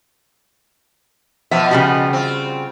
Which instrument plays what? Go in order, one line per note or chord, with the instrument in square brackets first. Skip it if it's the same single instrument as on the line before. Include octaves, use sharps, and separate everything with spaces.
[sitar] B2 F3 B3 [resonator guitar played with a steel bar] E5
[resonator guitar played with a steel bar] C#3 G3 F#4
[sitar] C4 F4